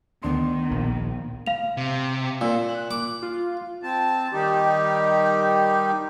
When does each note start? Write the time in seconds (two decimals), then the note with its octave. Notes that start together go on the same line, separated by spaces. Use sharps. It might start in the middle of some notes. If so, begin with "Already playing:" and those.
0.23 D2 D#3 B3 D4 C6
0.71 A#1
1.46 F5 F7
1.77 C3
2.41 A#2 E6
2.69 F#6
2.91 D6
3.22 F4
3.83 C4 A5
4.33 D#3 G3 D#4 G4